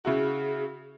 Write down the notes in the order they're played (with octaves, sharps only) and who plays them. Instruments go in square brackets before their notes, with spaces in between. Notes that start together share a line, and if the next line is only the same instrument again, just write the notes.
[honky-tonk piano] C#3 E4 F#4 [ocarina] G#4